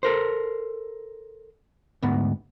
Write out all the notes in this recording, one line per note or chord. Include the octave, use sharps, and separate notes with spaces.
A4 A#4 C5
D2 G#2 B3